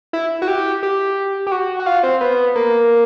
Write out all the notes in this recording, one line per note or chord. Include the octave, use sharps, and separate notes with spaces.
E4
F#4
G4
G4
G4
F#4
F#4
F4
C4
B3
A#3